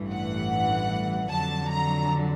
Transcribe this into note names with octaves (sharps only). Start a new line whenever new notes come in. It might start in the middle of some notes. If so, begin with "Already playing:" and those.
Already playing: A1 G2 E3
F#5
F2 D3 F#3 A5
A#5